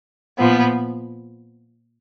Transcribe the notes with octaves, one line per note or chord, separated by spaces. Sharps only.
A#2 F3 B3